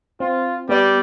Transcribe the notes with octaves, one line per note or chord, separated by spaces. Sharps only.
C4 F4
G3 B3 D5